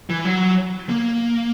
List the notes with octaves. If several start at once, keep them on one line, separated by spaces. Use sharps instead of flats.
E3
F#3
A#3